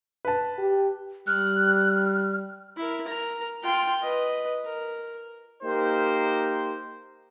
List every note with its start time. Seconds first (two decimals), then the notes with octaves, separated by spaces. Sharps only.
0.25 B4 A5
0.58 G4
1.27 G3 F6 F#6
2.77 E4 A#4
3.07 A#4 A#5
3.63 F4 G5
4.02 B4 D#5
4.65 A#4
5.63 A#3 D#4 G4 A#4 C5